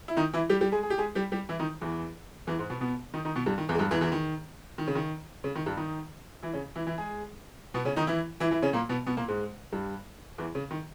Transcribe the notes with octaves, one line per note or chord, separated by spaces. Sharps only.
E4
D#3 D#4
E3 E4
G3 G4
G3 G4
G#3 G#4
G#4
G4
G#3 G#4
G3 G4
G3 G4
E3 E4
D#3 D#4
E2 E3
E2 E3
G#2 G#3
B2 B3
B2 B3
D#3 D#4
D#3 D#4
B2 B3
G2 G3
D#3
E2 E3
G#3
G2 G3
E2 E3
E2 E3
D#3
D#3
C#3
D#3
C#3
D#3
G2 G3
D#3 D#4
E3 E4
C#3 C#4
E3 E4
E3 E4
G#3 G#4
B2 B3
C#3 C#4
D#3 D#4
E3 E4
E3 E4
E3 E4
C#3 C#4
A#2 A#3
B2 B3
B2 B3
A#2 A#3
G#2 G#3
G2 G3
E2 E3
C#3
D#3